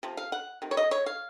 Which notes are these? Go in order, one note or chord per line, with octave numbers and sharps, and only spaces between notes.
C3 F3
F5
F#5
C3 D#3
C#5
D#5
C#5
F5